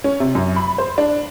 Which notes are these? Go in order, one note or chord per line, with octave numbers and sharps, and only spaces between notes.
C#4
C3
F#2
B5
C5
D4